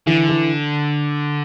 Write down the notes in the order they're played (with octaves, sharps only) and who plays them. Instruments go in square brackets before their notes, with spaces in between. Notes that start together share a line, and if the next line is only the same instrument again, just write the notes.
[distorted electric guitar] D3 [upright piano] E3
[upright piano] E3